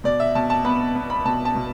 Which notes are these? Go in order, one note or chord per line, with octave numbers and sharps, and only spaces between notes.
B2 D5
E5
B2 A5
A5
B3 B5
B3
B5
B2 A5
A5
B2